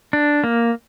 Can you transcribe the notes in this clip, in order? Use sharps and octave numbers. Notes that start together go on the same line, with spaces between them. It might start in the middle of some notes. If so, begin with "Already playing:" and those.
D4
A#3